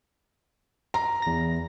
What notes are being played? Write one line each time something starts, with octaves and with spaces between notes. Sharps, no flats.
A#5
E2 A#6